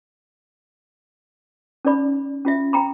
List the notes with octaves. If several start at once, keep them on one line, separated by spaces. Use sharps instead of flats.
C#4 D#4 D5 B5
C#4 F4 E5
G5 A#5 B5